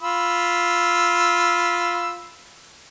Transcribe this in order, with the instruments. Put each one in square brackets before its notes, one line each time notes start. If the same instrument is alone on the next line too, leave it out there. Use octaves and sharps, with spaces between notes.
[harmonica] F4 B5 E6